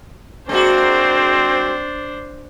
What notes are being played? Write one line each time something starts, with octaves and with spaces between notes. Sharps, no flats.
G#3 A#3 C4 D4 F#4 C5